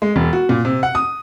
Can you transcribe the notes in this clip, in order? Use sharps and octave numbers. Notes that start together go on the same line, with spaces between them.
G#3
E1
F#4
A#2
C3
F#5
D#6